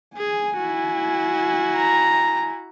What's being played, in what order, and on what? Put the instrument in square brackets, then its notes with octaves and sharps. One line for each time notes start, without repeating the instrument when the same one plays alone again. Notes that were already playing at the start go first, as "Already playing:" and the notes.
[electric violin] G#4 [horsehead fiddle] G#5
[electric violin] E4 F#4
[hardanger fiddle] A#5